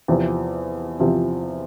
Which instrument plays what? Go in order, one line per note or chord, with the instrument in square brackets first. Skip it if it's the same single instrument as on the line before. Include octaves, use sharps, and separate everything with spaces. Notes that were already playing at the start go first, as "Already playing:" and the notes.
[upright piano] E2 C3 F3 C4
E2 C3 F3 C4